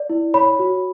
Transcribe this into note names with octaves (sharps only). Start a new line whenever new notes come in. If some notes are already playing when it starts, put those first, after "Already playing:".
Already playing: D5
E4
C#5 B5
F#4